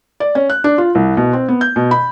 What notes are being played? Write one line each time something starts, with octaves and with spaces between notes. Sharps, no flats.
D5
C#4
F#6
D4
F4
C2
B2
C4
B3
G6
B2
B5